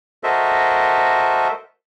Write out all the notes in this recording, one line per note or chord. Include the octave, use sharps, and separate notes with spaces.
F#4 A4 A#4 C5 D#5 E5